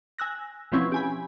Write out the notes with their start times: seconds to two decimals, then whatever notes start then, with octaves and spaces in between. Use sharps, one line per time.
0.18 G#5 E6 F#6 A#6
0.72 B2 E3 F3 C4 C#4 E4
0.92 G4 G#5 B5